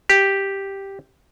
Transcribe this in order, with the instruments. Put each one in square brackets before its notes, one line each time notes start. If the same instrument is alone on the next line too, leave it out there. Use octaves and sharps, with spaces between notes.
[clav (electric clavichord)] G4